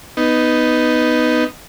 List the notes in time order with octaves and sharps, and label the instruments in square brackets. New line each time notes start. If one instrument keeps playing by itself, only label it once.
[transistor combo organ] B3 D#4